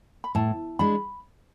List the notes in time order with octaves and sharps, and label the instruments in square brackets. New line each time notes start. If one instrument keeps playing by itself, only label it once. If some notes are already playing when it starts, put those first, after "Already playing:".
[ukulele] B5
[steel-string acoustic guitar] A2 [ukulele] A5
[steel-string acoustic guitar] G#3 D4 [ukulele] B5